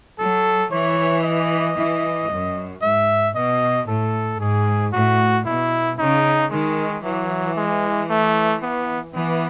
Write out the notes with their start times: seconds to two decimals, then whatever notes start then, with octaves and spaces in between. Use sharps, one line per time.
0.19 F#3 A4
0.71 E3 C#5
1.24 D#5
1.77 E3
2.30 F#2
2.82 G#2 E5
3.35 B2 D#5
3.88 A2 A4
4.40 G#2 G#4
4.93 A2 F#4
5.46 B2 E4
5.98 C#3 D#4
6.51 D#3 G#3
7.04 E3 F#3
7.57 G#3
8.10 A3
8.63 B3
9.14 E3 B3